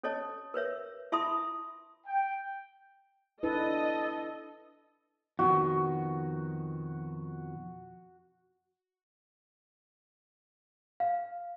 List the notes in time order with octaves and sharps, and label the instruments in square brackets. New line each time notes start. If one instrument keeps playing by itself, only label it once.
[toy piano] C#4 A4 C#5 D#5 A5
A#4 B4 C#5 E5
E4 E5 A5 B5 C6 D#6
[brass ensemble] G5
[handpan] D4 E4 B4 [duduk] A4 [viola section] D#5
[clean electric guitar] F2 B2 D#3 [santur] F#4
[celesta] F5